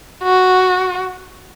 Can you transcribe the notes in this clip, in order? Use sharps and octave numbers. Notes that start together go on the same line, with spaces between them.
F#4